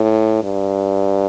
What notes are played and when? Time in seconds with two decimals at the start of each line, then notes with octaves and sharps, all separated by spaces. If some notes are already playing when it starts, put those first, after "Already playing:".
Already playing: A2
0.43 G2